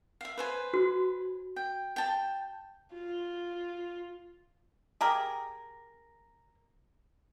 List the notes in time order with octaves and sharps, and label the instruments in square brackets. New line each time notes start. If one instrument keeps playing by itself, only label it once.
[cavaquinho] E5 F5
B4 C5 G#5
[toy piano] F#4
[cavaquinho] G5
G5 A5
[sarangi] F4
[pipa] G4 G#4 A#4